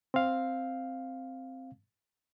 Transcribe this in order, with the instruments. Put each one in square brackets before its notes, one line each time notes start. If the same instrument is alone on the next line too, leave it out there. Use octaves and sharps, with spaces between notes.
[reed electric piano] C4 F5